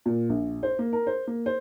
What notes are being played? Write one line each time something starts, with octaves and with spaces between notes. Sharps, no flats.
A#2
A#1
C5
A#3
A#4
C5
A#3
C5